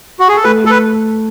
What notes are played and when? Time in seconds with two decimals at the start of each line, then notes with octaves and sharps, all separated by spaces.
0.20 F#4
0.28 G#4
0.37 A4
0.44 A3 B4
0.64 A3 A4
0.70 B4